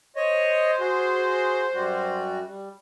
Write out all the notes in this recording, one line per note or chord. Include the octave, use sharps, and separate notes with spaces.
C5 C#5 D#5
F#4 G#4
F#2 G3 F#4
G3